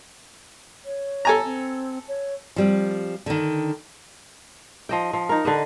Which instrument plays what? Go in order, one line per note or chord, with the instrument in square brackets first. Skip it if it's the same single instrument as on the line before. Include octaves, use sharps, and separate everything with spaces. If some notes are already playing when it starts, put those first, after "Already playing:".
[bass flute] C#5
[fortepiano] A4 G#5 A#5
[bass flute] C4
C#5
[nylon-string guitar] F3 G3 C4
D3 D#3
[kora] F3 D#5 G5
F3
D#4 A#4
D3 B4 D#5